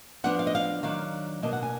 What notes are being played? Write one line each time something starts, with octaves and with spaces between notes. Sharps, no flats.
F3 B3 D4 F#5
F5
D#5
F5
D#3 F#3 D4 F5
B2 A#3 D4 D#5
F#5
G#5